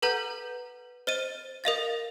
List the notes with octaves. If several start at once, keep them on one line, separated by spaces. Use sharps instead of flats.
A4 B4 F#5 A#5 G6
C5 D#5 D#7
A#4 D#5 F5 A6